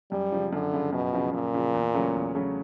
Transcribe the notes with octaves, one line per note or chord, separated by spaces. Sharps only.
F#2 G3
C#3 F3
F#2 D3
C#3 F3
F#2 B2
C#3 F3
F#2 A#2
C#3 F3
E2
C#3 F#3 A3 C#4
E2
C#3 F#3 A3 C#4